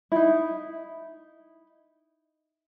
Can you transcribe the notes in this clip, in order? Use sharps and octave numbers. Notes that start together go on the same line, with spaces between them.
D#4 E4